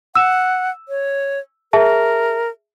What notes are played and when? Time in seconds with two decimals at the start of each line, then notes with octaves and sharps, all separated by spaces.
0.15 F#5 E6 E7
0.89 C#5
1.73 G#4 A#4 E5 A5